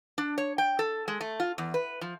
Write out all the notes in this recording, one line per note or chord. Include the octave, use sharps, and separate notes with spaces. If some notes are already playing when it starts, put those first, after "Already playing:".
D4
C#5
G5
A4
G#3
A3
F4
E2
B4
F3